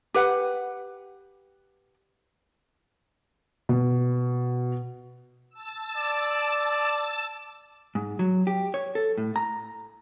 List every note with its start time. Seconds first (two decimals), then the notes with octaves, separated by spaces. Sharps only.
0.14 G4 B4 F#5
3.69 B2
5.50 A5 E6
5.97 D5
7.95 G#2
8.19 F#3
8.47 G4
8.74 C#5
8.95 A4
9.18 A2
9.36 A#5